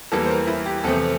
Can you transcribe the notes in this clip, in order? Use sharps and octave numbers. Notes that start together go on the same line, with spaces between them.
E2 E3 G3 A#3 A4
C5
A#4
E4
G4
E2 C3 F3 A3 A4